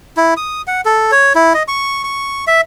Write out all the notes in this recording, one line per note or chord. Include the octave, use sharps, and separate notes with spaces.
E4
D#6
F#5
A4
C#5
E4
D#5
C#6
C#6
E5